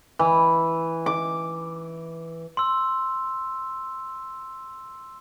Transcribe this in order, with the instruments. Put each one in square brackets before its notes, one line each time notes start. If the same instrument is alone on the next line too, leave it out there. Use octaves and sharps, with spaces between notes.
[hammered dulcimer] E3
D6
[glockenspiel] C6 E6